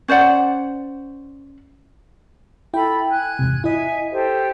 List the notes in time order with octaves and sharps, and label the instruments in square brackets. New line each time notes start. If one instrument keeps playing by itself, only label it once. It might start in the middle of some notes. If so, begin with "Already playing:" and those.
[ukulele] C#4 C5 D5 F#5
[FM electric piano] E4 G5 [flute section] A4 B5
[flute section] G#5 F#6 G#6
[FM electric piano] E2 G#2 C3
[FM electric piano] E4 D#5 [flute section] E5 G#5
[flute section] G4 A4 C5